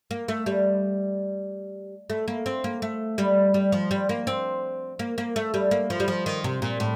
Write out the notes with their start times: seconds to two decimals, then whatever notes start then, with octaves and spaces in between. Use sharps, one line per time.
0.11 A#3
0.28 A3
0.46 G3
2.10 A3
2.28 A#3
2.46 C4
2.64 A#3
2.82 A3
3.18 G3
3.54 G3
3.72 F3
3.91 G3
4.09 A#3
4.27 C4
4.99 A#3
5.18 A#3
5.36 A3
5.54 G3
5.71 A#3
5.90 F3
6.00 G3
6.08 F3
6.26 D#3
6.44 C3
6.62 A#2
6.80 A2